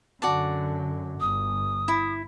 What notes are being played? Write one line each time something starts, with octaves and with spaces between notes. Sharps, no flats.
F#2 D3 F#4 D5 A5
G1 D#6
E4